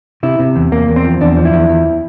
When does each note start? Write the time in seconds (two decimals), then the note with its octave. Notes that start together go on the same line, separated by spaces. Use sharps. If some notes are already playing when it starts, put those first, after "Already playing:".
0.23 C3 E4
0.39 C3
0.56 E2
0.72 E2 A#3
0.88 E2
0.96 C4
1.04 F3
1.21 E2 D4
1.37 F3
1.45 E4
1.54 E2
1.69 E2